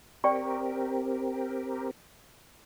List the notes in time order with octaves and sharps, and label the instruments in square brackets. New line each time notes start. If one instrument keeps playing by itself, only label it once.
[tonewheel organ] C4 G4 A#4 [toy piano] D5 G5 C#6